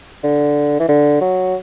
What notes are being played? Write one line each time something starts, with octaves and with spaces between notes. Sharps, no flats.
D3
E3
D3
F#3